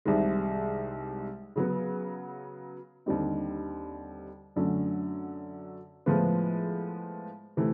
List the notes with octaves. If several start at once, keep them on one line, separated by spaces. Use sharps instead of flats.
C2 C3 D#3 G#3
C#3 F#3 B3
D#2 D3 G3 C4 D#4
F#2 D3 F#3 A3 C#4
A2 F3 G#3 B3
C3 E3 A3